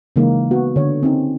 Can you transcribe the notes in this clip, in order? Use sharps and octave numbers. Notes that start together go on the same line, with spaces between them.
C#3 E3 G#3 A#3 D#4
B3 F#4
D3 C#5
C4 C#4 D#4